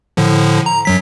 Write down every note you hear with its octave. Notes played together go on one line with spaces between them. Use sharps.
A2 D3 F3
A#5
F#2 F#3 B6